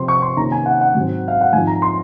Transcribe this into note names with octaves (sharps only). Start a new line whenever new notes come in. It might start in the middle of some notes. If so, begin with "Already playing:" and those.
Already playing: C3 F3 C4 C6
C#6
C6
C3 D#3 A#3 C#4 A#5
G#5
F#5
F#5
G#2 F#3 C4
F5
F#5
G#2 F3 C4 D#4 G#5
A#5
C6